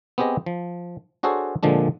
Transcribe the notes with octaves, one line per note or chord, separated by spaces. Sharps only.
B3 C4 G4 G#4 D#5
F3
D4 F#4 G#4 A4 C5 C#5
A#2 D3 F3 G#3 D4